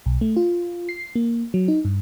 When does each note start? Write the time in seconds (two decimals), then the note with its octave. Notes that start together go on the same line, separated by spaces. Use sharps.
0.06 B1
0.21 A3
0.36 F4
0.89 C7
1.15 A#3
1.54 F#3
1.68 D#4
1.85 G2